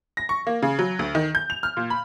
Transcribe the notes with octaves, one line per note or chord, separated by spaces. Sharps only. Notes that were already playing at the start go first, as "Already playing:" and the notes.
A#6
C#6
A#3
C#3
F#3
D2
D#3
G6
F7
F6
A#2
B5